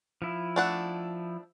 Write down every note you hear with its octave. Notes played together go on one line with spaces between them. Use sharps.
F3 E4
A3 D4 F#5